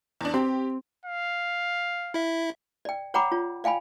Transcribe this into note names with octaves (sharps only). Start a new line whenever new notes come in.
E2 D4
C4 G4
F5
E4 E5
D5 G5
C#5 F#5 G5 A#5 B5 D6
F4 C#5
D5 F5 G5 G#5 B5